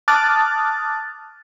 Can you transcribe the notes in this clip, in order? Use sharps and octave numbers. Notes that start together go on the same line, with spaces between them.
A5 D6 D#6 F6 F#6 A6